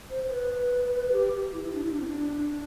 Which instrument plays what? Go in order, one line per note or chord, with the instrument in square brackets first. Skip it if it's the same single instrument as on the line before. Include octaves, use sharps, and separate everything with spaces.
[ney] C5
C5
B4
G4
G4
E4
E4
D4
E4
D4
C4
D4
D4